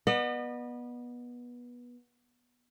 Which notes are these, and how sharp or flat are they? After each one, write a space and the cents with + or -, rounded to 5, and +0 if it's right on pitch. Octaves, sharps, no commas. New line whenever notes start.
B3 -20 D#5 -45